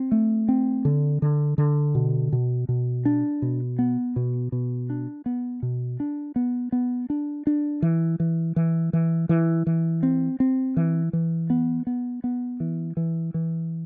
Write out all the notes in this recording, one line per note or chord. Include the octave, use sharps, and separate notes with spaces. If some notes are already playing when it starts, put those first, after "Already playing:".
Already playing: C4
A3
C4
D3
D3
D3
B2
B2
B2
D4
B2
B3
B2
B2
D4
B3
B2
D4
B3
B3
D4
D4
E3
E3
E3
E3
E3
E3
C4
C4
E3
E3
B3
B3
B3
E3
E3
E3